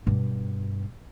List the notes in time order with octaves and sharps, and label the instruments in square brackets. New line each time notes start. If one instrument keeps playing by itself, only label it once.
[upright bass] G2 B2